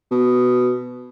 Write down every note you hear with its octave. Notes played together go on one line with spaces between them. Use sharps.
B2